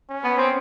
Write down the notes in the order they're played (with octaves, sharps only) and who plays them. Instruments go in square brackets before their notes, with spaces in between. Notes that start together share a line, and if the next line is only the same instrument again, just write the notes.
[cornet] C#4
[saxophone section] B3
C4